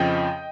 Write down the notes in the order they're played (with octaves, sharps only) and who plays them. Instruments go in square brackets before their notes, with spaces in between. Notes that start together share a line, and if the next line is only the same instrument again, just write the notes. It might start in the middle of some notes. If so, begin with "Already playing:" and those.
Already playing: [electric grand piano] F2 C#3 F3 D#5 G5